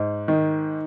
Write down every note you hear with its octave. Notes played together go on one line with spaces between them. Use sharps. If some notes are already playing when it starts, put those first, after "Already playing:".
Already playing: G#2
D#3